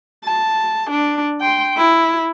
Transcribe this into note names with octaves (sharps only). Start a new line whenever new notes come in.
A5
D4
G5 C6
E4